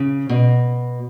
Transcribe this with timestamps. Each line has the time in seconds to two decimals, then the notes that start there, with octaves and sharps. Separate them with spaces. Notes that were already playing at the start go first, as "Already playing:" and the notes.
Already playing: C#3
0.29 B2